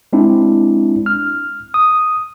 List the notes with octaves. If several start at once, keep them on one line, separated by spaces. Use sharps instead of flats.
G#3 C4 D4 E4
F6
D#6